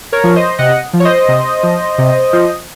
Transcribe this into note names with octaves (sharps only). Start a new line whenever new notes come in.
A#4 C#5
F3
C5 D#5
C3 D#5 F#5
F3
C#5
C5 D#5
C3
F3
C3
F3